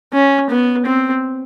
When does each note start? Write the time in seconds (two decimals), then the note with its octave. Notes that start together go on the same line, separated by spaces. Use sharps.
0.13 C#4
0.50 B3
0.86 C4